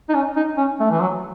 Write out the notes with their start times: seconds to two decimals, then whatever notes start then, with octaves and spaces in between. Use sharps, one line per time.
0.09 D#4
0.14 C#4
0.36 D#4
0.57 C#4
0.80 A3
0.91 E3
1.00 F#3